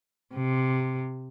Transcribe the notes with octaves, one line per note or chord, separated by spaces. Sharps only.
C3